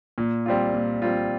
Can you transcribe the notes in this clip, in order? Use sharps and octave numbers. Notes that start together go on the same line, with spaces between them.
A#2
G3 C4 F4
A#2
G3 C4 F4